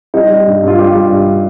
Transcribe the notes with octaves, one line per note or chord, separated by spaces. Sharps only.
G3 D#4
G3
G2
G2 F4
G3 G4
G3
G2